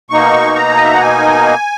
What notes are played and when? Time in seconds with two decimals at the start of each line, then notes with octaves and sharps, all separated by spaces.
0.10 B2 A#3 D#4 C#6
0.56 A#5
0.76 D#5
0.84 E5
0.93 F#5
1.01 G#5